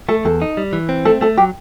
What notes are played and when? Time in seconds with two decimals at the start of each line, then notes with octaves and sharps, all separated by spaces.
0.09 A3 A4
0.25 E2 A4
0.42 D#4
0.57 G3
0.73 E3
0.89 C4
1.05 A3 A4
1.21 A3 A4
1.37 F#3 G4